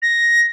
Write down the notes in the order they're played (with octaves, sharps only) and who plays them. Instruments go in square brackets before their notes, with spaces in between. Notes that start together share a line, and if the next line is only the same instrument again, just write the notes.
[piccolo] A#6